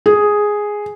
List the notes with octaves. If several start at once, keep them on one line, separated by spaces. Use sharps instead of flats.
G#4